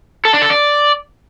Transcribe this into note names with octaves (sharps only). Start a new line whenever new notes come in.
A4
D4
A4
D5